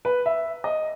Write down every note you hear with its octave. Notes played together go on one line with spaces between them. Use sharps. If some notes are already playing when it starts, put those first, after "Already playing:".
B4
E5
D#5